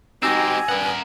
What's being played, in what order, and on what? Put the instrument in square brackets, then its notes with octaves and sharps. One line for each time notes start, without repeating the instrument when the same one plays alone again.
[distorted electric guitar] G#3 C4 [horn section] D#4 F#4 G4 [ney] G#5 [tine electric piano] E6 A#6
[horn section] G2 B3 [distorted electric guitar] A#4 F#5